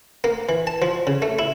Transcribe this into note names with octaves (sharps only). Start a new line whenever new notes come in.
A#3
E3
A5
F3
C#3
A3
E4